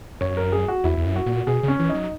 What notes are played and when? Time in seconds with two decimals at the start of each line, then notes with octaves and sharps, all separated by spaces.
0.21 F#2 C#5
0.37 A#4
0.52 G#4
0.68 F#4
0.84 E2 E4
0.97 E2
1.06 F#2
1.16 F#4
1.26 A#2
1.47 B2 G#4
1.63 C#3 C#4
1.79 E3
1.89 D#4
1.95 F#3